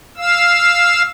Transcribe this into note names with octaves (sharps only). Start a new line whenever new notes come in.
F5 E6